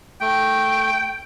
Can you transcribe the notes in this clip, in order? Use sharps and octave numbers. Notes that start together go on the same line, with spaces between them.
A3 G5